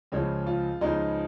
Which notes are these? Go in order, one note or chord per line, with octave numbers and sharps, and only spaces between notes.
C#2 C#3 F3 G#3 C#5
F4
C#2 C#3 F3 G#3 D#4